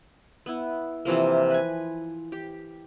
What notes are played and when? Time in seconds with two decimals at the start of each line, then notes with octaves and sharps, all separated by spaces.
0.46 B3 E4
1.05 C3 E3 F3 A#3
1.50 B4 G#5
2.32 G4